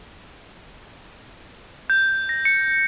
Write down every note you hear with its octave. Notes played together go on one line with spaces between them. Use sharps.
G6
A#6
C#7